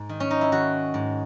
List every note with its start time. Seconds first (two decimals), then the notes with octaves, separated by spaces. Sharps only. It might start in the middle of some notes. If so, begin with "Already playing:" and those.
Already playing: G#2
0.09 D#3
0.20 C#4
0.31 D#4
0.41 E4
0.52 D#3 F#4
0.94 G#2